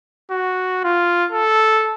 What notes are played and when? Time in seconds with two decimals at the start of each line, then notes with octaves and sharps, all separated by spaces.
0.31 F#4
0.84 F4
1.32 A4